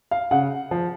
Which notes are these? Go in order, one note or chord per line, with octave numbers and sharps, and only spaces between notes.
F5
C#3 F#5
F3